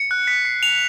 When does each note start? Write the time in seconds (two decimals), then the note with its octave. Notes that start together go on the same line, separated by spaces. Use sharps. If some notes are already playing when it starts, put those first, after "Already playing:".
Already playing: C#7
0.11 F#6
0.27 B6
0.45 C7
0.63 F7